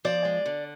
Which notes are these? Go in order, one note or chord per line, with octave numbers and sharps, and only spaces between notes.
F3 D5
G#3
D3